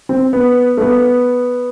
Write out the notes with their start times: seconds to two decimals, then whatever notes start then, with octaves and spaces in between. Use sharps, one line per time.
0.09 C4
0.33 B3
0.77 A3
0.81 B3